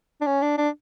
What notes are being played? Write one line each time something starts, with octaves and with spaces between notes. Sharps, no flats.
D4
C#4
D4
D4